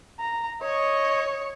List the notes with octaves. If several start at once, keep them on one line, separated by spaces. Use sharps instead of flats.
A#5
C#5 D#5 C#6